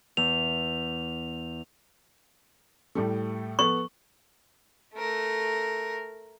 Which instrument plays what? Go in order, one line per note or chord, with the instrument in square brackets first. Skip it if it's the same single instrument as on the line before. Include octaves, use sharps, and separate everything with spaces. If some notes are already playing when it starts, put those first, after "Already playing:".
[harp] E2 [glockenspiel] F7
[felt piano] A2 G3 A3
[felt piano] B3 A4 [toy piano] C#6
[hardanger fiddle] A3 A#4